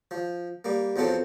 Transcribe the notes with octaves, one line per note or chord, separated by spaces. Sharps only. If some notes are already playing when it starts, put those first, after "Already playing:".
F3
G3 A#3
E2 F3 F#3 C4 A4 C5